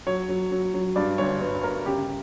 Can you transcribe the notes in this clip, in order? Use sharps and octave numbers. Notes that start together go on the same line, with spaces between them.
F#3 C#5
F#3
F#3
F#3
G2 D5
G1 C#5
G1 B4
G1 A#4
C#3 G4